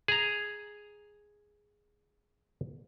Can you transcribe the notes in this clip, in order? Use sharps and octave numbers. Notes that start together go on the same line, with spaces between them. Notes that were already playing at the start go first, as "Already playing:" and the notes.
G#4 A#5